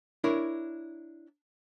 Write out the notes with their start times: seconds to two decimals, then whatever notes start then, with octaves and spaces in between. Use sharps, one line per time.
0.24 D4 E4 A#4 C#5